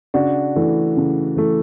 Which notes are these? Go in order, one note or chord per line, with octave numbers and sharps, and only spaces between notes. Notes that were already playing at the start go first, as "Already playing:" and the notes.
C#3 D4 F#4
E3 A3
C#3
E3 A3